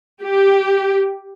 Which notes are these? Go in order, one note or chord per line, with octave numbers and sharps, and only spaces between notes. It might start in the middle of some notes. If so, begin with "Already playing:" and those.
G4